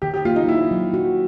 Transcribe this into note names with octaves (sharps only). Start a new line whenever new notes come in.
D#3 G4
G4
A#3 F4
D#4
A#3 E4
F#3
F#4